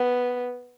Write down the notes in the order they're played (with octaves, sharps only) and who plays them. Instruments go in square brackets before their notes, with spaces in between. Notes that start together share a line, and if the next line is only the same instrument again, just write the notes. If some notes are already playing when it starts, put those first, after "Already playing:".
Already playing: [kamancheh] B3